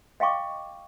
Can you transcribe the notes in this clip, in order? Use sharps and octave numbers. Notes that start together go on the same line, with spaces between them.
D#5 F5 G5 C#6 D6